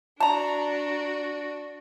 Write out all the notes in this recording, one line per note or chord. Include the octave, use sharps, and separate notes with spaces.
D4 F#4 A5 A#5